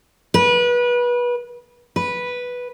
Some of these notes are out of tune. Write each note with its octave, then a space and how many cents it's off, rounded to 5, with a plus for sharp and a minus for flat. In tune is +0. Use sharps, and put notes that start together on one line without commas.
B4 -25
B4 -5